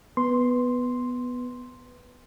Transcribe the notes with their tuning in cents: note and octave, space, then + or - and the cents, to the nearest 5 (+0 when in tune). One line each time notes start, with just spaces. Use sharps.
B3 +0 B4 +0 C6 +0